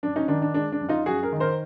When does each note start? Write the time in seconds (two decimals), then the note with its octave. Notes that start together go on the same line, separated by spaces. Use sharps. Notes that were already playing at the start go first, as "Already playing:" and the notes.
0.03 F#2 D4
0.16 C#4 D#4
0.28 D#3 D4
0.42 D4
0.54 G#3 D4
0.72 D4
0.81 F#2
0.89 D#4 F4
1.06 F#2 F#4 G#4
1.23 G#4 A#4
1.33 D#3
1.40 A#4 C5